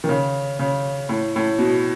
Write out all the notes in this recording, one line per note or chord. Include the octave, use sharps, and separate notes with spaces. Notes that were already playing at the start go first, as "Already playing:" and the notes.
D#3
C#3
C#3
A2
A2
B2